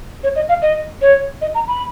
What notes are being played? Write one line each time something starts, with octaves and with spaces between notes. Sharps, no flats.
C#5
D#5
F5
D#5
C#5
D#5
A#5
B5